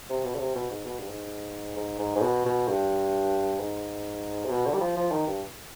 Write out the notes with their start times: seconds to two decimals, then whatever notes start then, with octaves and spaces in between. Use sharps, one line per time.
0.09 C3
0.25 B2
0.35 D3
0.40 C3
0.55 B2
0.71 G#2
0.85 B2
0.99 G2
1.08 G#2
1.76 G#2
1.99 G#2
2.16 G#2
2.22 B2
2.46 B2
2.68 G2
3.59 G#2
4.45 C3
4.50 B2
4.66 D3
4.74 G3
4.81 F3
4.97 F3
5.12 D#3
5.27 G2